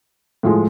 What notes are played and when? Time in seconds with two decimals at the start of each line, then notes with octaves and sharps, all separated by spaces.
0.43 A2 F3 G#3